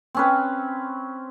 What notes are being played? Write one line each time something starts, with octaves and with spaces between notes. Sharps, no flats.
C4 C#4 B4